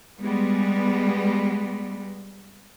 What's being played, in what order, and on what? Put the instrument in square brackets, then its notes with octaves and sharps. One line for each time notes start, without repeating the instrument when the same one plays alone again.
[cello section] G3 G#3 B3